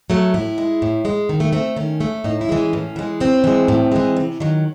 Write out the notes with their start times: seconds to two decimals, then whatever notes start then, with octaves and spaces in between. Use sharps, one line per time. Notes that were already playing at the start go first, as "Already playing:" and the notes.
0.10 F#3 A3
0.34 A2 E4
0.58 G#3
0.82 A2
1.05 G#3
1.29 D#3
1.40 A3
1.53 A3 C4
1.76 D#3 C#4
2.01 A3
2.24 A2 D#4
2.41 E4
2.49 E3 G#3
2.57 C#4
2.73 A2
2.96 E3 G#3
3.20 A2 C4
3.44 E3 G#3
3.68 A2
3.92 E3 G#3
4.17 C3
4.40 D#3 F#3